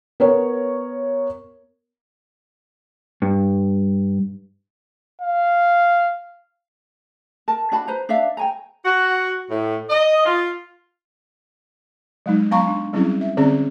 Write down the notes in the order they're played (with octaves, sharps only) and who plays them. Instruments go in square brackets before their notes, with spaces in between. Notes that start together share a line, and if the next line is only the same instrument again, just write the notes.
[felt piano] B3 A#4 C#5
[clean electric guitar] G2
[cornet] F5
[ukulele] A#4 A5
D4 F#4 A5 B5
B4 C5 A#5
D4 D5 E5 F5
G5 G#5 A#5
[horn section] F#4
A2
D#5
F4
[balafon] F#3 G#3 D#4
F#3 B3 F5 A#5 C#6
D4
F#3 G3 C4 C#4 E4 G#4
E5
D3 C4 C#4 G#4 D5